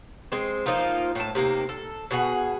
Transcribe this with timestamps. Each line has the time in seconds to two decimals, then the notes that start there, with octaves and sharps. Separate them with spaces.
0.32 G#3 C4
0.66 F3 A#3 D#4 F4
1.15 A2 A5
1.35 C3 D#3 A#3
1.69 A4
2.11 B2 G#4 F#5